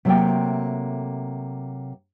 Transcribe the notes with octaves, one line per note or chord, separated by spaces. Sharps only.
C3 F#3 A3 A#3 A4 G5